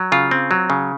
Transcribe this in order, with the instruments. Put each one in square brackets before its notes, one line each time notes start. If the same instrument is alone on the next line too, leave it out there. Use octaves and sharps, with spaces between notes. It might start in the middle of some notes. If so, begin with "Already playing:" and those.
Already playing: [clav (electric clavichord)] F#3
C#3 F4
C4
F#3
C#3